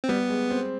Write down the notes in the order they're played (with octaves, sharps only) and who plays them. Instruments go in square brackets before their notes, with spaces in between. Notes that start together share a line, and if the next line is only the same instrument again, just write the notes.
[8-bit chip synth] C4
[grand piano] G3 [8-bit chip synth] B3
[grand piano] G#3
C4